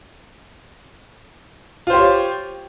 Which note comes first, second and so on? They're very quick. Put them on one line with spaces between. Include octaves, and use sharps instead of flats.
F4 C5 G4 C#5